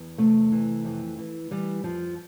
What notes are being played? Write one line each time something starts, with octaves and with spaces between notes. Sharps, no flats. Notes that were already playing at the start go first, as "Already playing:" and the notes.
Already playing: E2
C3 A3
E3
F2
E3
E3 G3
F2 F3